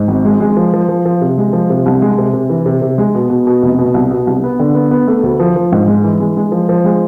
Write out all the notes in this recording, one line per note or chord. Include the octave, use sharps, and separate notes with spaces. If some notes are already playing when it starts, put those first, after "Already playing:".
Already playing: G#2
G#1
G#3
G#3
F3
F3
F3
F3
C3
G#3
F3
C3
C2
G#3
C3
C3
E3
C3
C3
G#3
B2
B2
B2
F1
B2
C2
B2
C2
B3
D3
B3
B3
A3
D2
F3
F3
G#2
G#3
E3
G#3
G#3
F3
F3
G#3